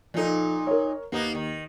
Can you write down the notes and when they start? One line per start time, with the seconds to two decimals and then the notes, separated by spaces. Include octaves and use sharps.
0.14 A#2 F3 D#4 A4
0.67 A#4 C#5
1.12 D#2 A#3 B3 D#4
1.35 D#3